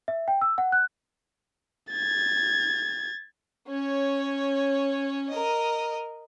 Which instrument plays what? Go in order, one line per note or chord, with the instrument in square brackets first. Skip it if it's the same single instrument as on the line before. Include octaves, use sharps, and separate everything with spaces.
[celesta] E5
G5
E6
F#5
F#6
[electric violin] G#6 A6
[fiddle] C#4 C#5
A#4 D#5